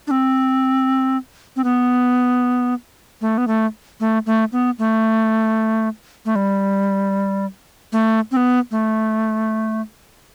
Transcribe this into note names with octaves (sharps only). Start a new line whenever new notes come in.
D4
C4
C4
B3
A3
B3
A3
A3
A3
B3
A3
A3
G3
A3
C4
B3
A3